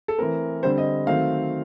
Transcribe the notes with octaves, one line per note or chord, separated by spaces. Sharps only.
A4
E3 A3 C4 A#4
D3 G3 C4 C5
D#5
D#3 F#3 A3 C4 F5